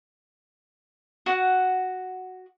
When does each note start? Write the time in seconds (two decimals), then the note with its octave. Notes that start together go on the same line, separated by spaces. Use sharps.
1.26 F#4 F#5